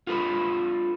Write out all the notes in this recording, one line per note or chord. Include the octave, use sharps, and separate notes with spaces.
F4 A4 B4